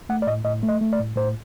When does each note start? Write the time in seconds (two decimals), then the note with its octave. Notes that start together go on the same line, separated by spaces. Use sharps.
0.09 A3 F#5
0.22 D5
0.27 A2 D#5
0.45 A2 D#5
0.63 A3
0.69 D#5
0.81 A3
0.93 D5
0.99 A2
1.16 A2 C5